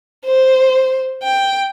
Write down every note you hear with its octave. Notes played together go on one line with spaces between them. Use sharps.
C5
G5